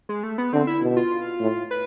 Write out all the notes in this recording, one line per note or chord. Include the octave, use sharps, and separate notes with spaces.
G#3
A3
B3
D3 C4
E4
B2
F4
A2
B4